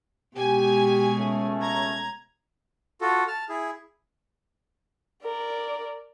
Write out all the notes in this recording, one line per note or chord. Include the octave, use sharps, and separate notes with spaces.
B2 G#3 G4 G#5
C#2 A3 C#4
A#5 G#6
F4 F#4 A4
A5 F6
E4 G#4
A#4 D5